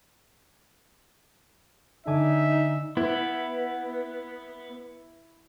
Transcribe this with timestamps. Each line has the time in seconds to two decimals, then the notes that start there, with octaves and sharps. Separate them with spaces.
2.07 D3 D#4 E5 G#5 D6
2.97 B3 E4